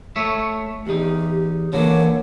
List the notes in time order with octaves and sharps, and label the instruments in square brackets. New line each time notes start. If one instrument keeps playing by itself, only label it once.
[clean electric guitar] A3 C#5 E5
[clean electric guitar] E2 D#4 [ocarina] G4
[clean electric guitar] D3 E3 A#3 [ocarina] C#5